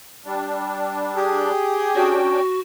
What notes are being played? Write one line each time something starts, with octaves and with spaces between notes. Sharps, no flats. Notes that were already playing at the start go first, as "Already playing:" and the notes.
G3 D4
G4 G#4
C#4 D4 F#4 G5